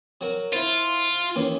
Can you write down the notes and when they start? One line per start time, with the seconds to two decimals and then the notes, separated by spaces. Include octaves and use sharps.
0.21 F#3 F#4 A#4
0.53 E4 F4 C5
1.36 D#2 E3 C#4